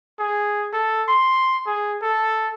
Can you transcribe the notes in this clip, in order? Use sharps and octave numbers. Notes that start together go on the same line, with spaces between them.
G#4
A4
C6
G#4
A4